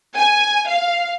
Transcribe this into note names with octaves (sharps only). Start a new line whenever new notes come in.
G#5
F5